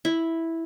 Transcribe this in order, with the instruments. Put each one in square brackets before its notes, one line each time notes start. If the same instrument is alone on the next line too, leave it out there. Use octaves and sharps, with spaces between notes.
[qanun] E4